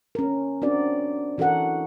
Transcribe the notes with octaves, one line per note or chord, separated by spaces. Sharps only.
C#4 A#4
C4 D4 F#4 A#4 D5
E3 F#4 A4 A#4 F#5